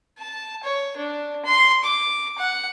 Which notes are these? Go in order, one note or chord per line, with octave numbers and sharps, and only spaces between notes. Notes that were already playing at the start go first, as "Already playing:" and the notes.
A5
C#5
D4
C6
D6
F#5